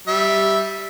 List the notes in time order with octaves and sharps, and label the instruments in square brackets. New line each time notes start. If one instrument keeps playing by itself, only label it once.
[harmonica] G3 E5